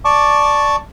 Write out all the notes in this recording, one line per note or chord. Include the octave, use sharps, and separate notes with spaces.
D5 A5 C#6 D6